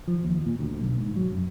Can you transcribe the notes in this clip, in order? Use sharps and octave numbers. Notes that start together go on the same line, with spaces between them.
F3
D#2
A#2
D2
B1
G#2
F#3
F#2